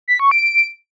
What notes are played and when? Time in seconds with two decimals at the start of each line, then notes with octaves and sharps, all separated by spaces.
0.08 B6
0.20 C#6
0.31 D7